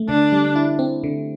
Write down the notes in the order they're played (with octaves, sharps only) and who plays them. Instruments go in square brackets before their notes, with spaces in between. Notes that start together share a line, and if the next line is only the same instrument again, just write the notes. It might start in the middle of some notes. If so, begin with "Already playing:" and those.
Already playing: [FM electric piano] A3
[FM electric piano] D3 [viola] D4
[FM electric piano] G3
E4
C4
D3